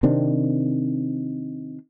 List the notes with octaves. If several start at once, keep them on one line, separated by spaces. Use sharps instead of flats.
C3 D#3 C4 D4